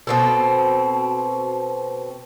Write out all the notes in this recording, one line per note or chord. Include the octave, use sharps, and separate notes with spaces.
B2 C4 A4